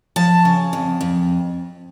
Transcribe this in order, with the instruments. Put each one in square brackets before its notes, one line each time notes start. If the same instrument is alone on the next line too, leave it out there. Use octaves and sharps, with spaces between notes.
[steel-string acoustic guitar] F3 A5
C#3
F2
F2